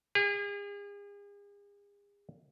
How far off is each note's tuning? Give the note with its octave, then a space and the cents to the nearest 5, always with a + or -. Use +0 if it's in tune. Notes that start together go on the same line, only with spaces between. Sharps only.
G#4 -40